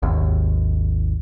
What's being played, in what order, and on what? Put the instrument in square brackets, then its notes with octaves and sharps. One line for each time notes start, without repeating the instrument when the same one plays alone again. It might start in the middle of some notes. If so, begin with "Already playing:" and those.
[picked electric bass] G#1 D#2